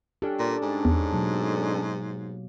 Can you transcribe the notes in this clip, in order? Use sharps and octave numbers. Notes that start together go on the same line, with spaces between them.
C#4 D4 G4 A4
A#2
G#2
E2
B2 F#3 A#3